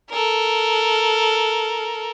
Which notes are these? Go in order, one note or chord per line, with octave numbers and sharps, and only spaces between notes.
A4 A#4